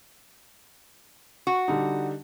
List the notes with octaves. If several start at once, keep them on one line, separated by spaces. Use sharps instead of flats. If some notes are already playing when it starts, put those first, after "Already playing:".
F#4
D3 G3 D#4